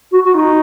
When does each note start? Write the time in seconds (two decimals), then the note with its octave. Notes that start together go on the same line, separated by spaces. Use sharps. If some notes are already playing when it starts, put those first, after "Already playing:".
0.11 F#4
0.24 F#4
0.34 D#4